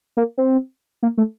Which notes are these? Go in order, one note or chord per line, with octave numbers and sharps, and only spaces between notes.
A#3
C4
A#3
A3